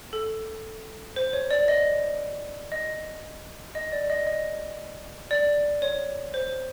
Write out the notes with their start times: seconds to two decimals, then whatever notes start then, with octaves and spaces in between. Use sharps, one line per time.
0.13 A4
1.16 C5
1.33 C#5
1.51 D5
1.68 D#5
2.72 D#5
3.75 D#5
3.92 D5
4.10 D#5
4.27 D#5
5.31 D5
5.82 C#5
6.34 C5